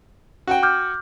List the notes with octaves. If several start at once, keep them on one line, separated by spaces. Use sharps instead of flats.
F#4 F#5 G5
D6 F6 G6